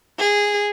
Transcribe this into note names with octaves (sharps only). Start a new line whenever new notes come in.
G#4